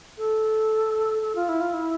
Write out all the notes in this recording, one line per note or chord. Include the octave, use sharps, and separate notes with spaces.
A4
A4
F4
E4
F4
E4